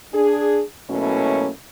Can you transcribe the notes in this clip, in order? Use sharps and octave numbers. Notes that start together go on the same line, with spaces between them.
D4 G#4
B2 F#3 A3 A#3 C#4 E4